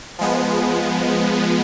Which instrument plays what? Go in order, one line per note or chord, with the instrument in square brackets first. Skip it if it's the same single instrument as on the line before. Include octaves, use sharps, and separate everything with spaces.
[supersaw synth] F3 G#3 B3